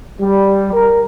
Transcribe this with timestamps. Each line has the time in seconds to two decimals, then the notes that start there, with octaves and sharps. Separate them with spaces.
0.21 G3
0.73 A#4